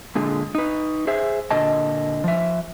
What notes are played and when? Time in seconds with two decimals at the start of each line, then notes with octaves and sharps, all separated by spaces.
0.15 A#2 D3 G#3
0.55 D#4 B4
1.07 G#4 C5 E5
1.51 A#2 D3 D#5 A5
2.24 F3 E5